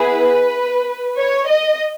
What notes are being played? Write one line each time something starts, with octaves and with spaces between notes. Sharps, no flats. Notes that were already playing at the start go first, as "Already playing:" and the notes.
Already playing: B3 E4 G#4 B4
C#5
D#5